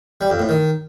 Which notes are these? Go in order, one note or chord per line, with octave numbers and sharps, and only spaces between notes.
G3
F2
A2
D#3